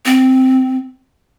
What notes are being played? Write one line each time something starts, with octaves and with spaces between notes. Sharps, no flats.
C4